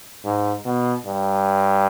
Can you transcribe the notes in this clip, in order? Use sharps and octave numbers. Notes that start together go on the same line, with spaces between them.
G#2
B2
G2